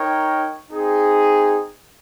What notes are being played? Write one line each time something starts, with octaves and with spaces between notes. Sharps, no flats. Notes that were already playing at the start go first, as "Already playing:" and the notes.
Already playing: D#4 A#4 C#5 G5
C4 D#4 G#4